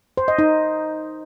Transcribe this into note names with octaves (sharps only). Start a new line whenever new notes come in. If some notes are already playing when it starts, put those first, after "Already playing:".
C5
D#5
D#4